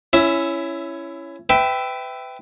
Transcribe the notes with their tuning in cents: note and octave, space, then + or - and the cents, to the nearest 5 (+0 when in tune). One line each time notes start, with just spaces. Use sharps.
C#4 +0 E4 +20 E5 +0
B4 +30 E5 +0 G5 +0